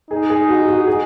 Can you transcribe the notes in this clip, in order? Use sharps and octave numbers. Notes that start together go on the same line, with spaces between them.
D#4 G#4
G#4
F#4
F#4
G#4